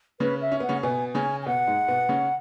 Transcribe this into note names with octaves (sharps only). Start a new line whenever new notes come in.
C#3 C#4 B4
E5
C#4
B3 F#5
C#3 C#4
B2 B3 G#5
C#3 C#4 G#5
G#5
B2 B3 F#5
G#2 G#3
B2 B3
C#3 C#4